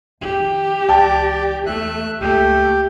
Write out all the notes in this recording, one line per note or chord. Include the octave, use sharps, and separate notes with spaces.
F2 D#3 G4
C#2 E3 D5 G5 A5
E2 A3 E5 F#6
F#1 C#2 A3 G4